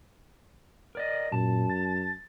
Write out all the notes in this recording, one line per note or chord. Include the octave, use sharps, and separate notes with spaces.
A#4 D5 D#5
F#2 A#2 A5
A6